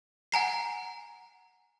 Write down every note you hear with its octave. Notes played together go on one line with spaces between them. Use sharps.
F#5 G#5 A#5 C7